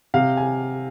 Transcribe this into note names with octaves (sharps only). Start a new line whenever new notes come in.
C3 F5
G#5